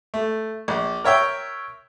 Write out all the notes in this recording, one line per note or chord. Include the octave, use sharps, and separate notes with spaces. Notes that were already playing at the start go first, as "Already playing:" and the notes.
A3
A#1
A#4 C#5 E5 G5